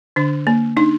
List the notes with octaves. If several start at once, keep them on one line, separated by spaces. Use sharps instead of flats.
D3 D4
A#3
D4 D#4